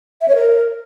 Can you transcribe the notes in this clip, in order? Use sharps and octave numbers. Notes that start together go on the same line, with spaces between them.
E5
C#5
A#4